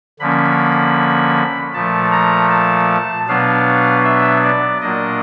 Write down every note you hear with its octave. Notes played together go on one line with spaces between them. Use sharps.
D3 F3 A#3 C#4 B5
A#2 F3 A3 A5
A#5
A5
B2 F#3 B3 D4 F5
E5
D5
A#2 F#3 A#3 D4 D#5